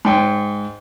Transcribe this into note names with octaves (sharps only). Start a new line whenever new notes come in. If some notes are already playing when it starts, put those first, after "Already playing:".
G#2 G5 G#5